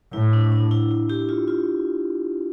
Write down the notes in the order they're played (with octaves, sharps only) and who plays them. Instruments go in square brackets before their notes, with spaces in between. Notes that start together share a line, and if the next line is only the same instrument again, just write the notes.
[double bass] A2 [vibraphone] E4
[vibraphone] D4
D4
E4
E4
E4 G4
F4
F4